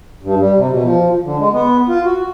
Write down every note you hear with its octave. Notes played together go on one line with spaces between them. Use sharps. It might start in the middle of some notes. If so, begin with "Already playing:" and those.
G2
G3
C3
B2
F3
D3
G#3
B3
F4
F#4